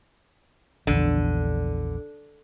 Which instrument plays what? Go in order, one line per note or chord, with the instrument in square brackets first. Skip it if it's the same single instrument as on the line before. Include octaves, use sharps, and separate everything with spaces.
[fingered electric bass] A#1 E2 [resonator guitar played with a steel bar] D3